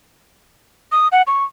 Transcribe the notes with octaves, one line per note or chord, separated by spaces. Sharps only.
D#6
F#5
C#6